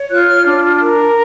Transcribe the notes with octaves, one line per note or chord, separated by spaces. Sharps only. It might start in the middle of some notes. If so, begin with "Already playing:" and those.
Already playing: C#5
F4 F#6
F6
D4
A#4